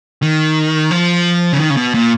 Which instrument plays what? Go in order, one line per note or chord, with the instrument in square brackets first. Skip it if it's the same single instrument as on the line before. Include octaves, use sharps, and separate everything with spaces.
[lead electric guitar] D#3
F3
C#3
D#3
C#3
B2
A#2